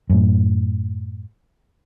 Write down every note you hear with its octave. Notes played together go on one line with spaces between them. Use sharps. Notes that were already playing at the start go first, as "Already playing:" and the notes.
F#2 A2